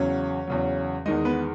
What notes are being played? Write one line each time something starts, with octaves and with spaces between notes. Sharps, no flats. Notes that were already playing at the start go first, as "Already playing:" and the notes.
Already playing: E2 C#3 F#3 C#4 C#5
E2 C#3 F#3
E2 D#3 G#3 D#4 D#5
B3 B4